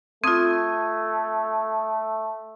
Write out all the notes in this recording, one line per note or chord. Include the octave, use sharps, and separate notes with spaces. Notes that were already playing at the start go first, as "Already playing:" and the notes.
A3 C4 F4 D#6 G#6